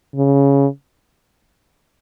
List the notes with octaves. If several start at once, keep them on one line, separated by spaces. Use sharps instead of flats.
C#3